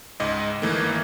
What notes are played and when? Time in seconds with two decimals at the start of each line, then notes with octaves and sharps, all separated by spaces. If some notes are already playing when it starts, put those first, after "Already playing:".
0.20 C#2 G#2 D#5
0.62 G1 D#3 E3 A3 A#3